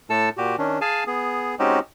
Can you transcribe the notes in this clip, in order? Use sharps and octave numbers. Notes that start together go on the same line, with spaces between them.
A2 A3 A4 A5 E6
A#2 F#4 G4
D#3 C#4 D4
G#4 F5 G#5 A5
B3 G#4
G#3 C4 C#4 D#4 F#4 G4